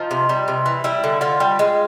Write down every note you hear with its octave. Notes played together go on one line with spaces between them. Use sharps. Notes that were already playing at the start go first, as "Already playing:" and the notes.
Already playing: F3 D#4
C3
G3
C3
E3
G3 E4
D3
D3 F4
G3
G#3